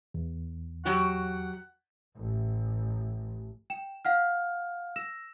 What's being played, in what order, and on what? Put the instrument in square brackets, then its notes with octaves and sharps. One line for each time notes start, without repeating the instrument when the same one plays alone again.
[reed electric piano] E2
[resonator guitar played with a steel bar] F#3 F#4 G4 [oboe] F#5
[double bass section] A1
[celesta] G5 E7
F5 F#5 F6
E6 A#6 E7